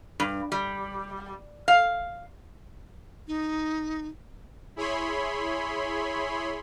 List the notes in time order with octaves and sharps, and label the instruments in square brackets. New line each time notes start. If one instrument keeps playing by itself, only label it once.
[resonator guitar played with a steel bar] G2
G3
F5
[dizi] D#4
[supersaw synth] E4 G#4 C#5 B5 C6